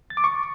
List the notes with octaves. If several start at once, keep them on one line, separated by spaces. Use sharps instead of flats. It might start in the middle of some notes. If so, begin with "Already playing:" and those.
A6
D6
C#6